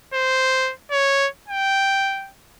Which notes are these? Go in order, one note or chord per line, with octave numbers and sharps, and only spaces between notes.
C5
C#5
G5